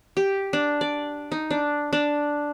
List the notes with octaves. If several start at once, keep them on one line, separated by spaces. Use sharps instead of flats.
G4
D4
D5
D#4
D4
D4